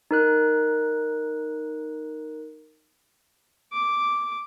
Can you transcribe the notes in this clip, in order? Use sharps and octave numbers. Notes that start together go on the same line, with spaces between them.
D#4 A#4 F#6
D6